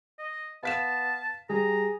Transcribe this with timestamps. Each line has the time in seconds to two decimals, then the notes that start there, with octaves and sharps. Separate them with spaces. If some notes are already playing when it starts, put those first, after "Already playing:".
0.19 D#5
0.63 B3 F5 A5 B6 E7
1.49 G3 G#4 A#5